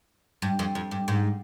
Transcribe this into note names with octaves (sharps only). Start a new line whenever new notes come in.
G2
F2
F2
G2
G#2